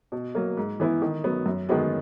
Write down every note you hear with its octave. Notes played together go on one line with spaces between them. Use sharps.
B2
F#3 A#3
G#2
E3 B3 E4
D#3
F#3 B3
F#2
D#3 G#3 B3 F#4